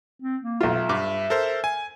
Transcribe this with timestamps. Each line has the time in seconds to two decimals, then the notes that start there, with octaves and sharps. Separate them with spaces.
0.22 C4
0.43 A#3
0.61 B1 F4 E5
0.89 G2 D6
1.30 A4 A#4 C5
1.64 G#5